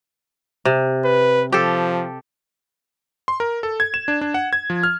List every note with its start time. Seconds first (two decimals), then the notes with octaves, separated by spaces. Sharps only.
0.65 C3
1.05 B4
1.52 F3 G4 A4
3.28 C6
3.40 A#4
3.63 A4
3.80 G#6
3.94 E7
4.08 D4
4.21 D4
4.34 F#5
4.53 G#6
4.70 F3
4.83 F6